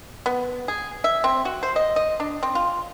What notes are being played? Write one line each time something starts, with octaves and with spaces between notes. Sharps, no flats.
B3
G#4
E5
C4
F#4
C5
D#5
D#5
D4
C4
F4